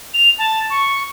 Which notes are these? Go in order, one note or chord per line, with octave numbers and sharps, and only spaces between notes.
F7
A5
C#6